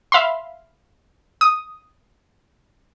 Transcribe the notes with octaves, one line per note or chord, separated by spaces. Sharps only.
E5 F5 B5 C6
D#6